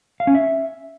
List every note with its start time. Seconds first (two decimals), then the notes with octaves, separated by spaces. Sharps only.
0.20 F5
0.27 C#4
0.35 E5